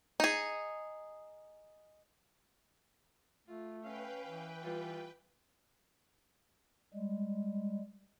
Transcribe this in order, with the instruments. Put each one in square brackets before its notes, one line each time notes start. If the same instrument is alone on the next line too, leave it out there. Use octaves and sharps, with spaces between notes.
[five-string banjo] D#4 G#4
[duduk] A3 [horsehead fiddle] F4
[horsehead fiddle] C#4 F5 [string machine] B4 G5
[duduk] E3
[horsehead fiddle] G3 F4
[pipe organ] G3 G#3